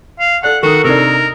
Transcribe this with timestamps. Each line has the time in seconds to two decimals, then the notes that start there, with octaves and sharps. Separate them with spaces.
0.20 F5
0.43 A4 D5 F#5 F#6
0.63 D#3 F#4 A4 A#4 C#6 D#6
0.84 C3 D4 D#4 A#4 E6